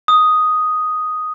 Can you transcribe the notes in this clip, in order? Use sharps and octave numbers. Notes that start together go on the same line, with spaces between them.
D#6